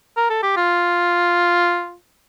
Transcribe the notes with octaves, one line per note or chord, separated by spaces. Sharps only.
A#4
A4
G4
F4